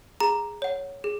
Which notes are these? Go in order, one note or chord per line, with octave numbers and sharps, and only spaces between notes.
G#4 A#5
C#5 F#5
G#4